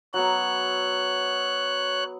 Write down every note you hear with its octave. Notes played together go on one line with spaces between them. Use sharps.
F#3 B3 C#5 F#6